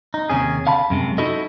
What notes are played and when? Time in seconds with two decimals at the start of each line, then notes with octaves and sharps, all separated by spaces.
0.14 D#4
0.30 D#2 C3 C#4 G#4
0.66 D3 F5 A5 B5
0.90 F#2 C3 G#3
1.18 D#4 E4 F#4 A4 D#5